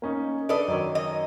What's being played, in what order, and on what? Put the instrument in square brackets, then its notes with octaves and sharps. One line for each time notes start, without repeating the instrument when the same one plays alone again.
[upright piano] A#3 C#4 D#4
[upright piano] D4 A4 B4 [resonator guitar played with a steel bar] D5 D#5
[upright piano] F#2 D#3 C#5
[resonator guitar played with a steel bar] D#5